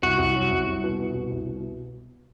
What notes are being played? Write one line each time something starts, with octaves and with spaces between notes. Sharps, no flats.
C2 F#4
C2
F#3
C2
C2
B2
B2
C2
C2
B2